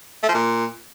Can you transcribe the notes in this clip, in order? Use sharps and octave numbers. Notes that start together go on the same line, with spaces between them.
A3
F3
A#2